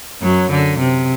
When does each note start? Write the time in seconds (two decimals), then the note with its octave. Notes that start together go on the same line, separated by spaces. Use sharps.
0.22 F#2 F#3
0.51 D3
0.79 C3